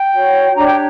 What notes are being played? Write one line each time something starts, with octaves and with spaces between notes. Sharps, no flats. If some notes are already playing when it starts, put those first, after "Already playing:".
Already playing: G5
F#4 C#5
D4 G4 C#5 A#5
G5